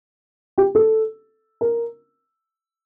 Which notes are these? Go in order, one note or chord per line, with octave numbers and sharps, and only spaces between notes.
G4
A4
A#4